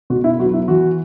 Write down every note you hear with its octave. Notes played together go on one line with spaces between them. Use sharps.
B2 F#4
E4
F#3 F#4
B3
E4
E3 F#4